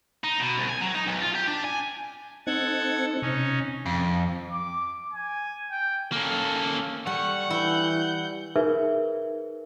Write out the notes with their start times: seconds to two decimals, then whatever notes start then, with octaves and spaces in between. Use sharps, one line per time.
0.24 D#4
0.40 B2
0.58 C2
0.70 G#5
0.82 F#3
0.95 D#4
1.07 B1
1.22 F4
1.35 G4
1.47 D4
1.65 G#5
2.47 C4 D#4 A4 F#5 G#6
3.22 C3 C#4 D#4
3.86 F2
4.52 D6
5.13 G#5
5.72 G5
6.12 A#3 C#4 A4
7.07 G3 F#5 C#6
7.50 E3 E4 G6
8.56 D#4 G#4 A#4 B4 E5